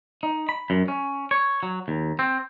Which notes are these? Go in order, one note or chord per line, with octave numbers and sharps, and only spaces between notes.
D#4
B5
F#2
C#4
C#5
F#3
D#2
C4